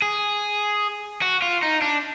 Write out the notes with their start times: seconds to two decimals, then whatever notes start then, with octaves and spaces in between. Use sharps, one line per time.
0.02 G#4
1.22 F#4
1.42 F4
1.63 D#4
1.82 D4